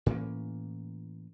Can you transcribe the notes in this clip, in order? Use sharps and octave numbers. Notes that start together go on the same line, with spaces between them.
A2 E3 A#3 C#4